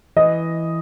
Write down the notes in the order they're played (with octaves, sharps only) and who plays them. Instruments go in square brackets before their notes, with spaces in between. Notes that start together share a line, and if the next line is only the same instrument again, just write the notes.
[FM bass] E3 [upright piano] D#5